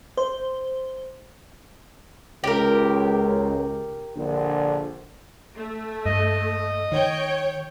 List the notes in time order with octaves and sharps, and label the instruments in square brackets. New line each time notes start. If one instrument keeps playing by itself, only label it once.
[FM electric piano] C5
[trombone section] C#2 [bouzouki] G4 A#4
[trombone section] A#1 D3
[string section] A3
[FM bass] G2 [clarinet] D#5
[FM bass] D#3 [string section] C#5 G5